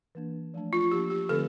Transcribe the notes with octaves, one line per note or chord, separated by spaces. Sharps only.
E3 A#3 D4
F3 A3 D4
F4
F3 A#3 D4 G4
G4
D3 F3 A3 C4 A4